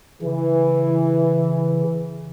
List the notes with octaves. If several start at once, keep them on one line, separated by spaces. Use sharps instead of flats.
C#3 E3